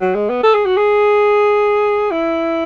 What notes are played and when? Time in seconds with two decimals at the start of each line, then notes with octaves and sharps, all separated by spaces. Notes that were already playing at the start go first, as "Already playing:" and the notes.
0.01 F#3
0.15 G#3
0.30 B3
0.43 A4
0.54 G#4
0.65 F#4
0.77 G#4
2.11 E4